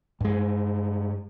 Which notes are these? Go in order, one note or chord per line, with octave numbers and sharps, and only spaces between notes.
G2 G#3